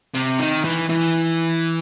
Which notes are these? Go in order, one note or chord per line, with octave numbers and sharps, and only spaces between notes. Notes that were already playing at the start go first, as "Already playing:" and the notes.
C3
D#3
E3
E3